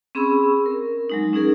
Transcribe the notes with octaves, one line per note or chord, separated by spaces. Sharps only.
C4 C#4 G#4 B5 C#6 E6
A#4
F#3 G#3 D#4
C#4 D#4 G#4 A#4